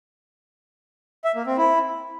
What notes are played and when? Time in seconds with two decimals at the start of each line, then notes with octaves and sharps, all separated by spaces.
1.24 E5
1.35 A#3
1.47 C4
1.58 E4